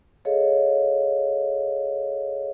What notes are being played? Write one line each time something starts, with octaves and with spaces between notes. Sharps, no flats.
G#4 A4 C#5 D#5 F5